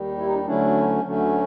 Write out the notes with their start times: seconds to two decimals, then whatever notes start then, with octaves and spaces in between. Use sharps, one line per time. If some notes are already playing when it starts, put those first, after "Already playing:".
Already playing: D#2 D#3 G3
0.17 E4
0.26 D#4
0.34 D4 E4
0.45 D2 D3 F#3 A3 C#4 D4 E4
1.02 D2 D3 F#3 A3 C#4